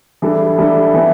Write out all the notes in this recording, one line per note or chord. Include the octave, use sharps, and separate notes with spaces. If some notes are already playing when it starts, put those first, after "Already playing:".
E3 G3 D4 A4
E3 G3 D4 A4
E3 B3 E4